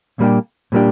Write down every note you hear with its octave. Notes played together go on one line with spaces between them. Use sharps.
A#2 G3 A#3 D4 G4
A#2 G3 A#3 D4 G4